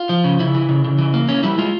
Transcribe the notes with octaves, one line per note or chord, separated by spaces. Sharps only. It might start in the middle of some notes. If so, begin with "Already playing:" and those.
Already playing: F4
F3
C#3
C#3 E4
E3
C#3
C#3
E3
A#3
E3 C#4
G3 E4
G#3 F4